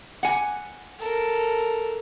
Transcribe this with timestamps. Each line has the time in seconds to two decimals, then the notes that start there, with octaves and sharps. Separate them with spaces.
0.23 F#5 G#5
1.00 A4 A#4